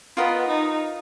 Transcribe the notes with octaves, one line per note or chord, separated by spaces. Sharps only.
B3 F4 A#4 D#5
D#4